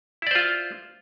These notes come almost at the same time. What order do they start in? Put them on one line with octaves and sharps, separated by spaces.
E4 D5 C5 F4